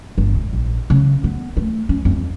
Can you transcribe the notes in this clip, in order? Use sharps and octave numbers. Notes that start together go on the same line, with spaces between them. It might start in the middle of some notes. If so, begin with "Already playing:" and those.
G1
G#2
A#1
C#3
B3
A3
C#4
F2